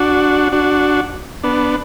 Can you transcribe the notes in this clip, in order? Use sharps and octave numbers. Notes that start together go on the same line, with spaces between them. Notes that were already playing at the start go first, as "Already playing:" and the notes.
Already playing: D4 F#4
D4 F#4
B3 D4